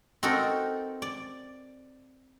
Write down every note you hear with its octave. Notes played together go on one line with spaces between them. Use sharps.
C4 D#4 F#4 A4 A#4
D5